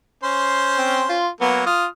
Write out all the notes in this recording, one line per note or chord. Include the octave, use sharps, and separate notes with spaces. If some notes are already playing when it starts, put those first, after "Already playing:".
C#4 C5 C6
C4
F4
F#3 A#3 B3
F4 D#6 F6